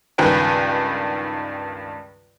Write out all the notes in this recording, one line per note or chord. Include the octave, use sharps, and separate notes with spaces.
C#2 G2 D#3 B4 G5 G#5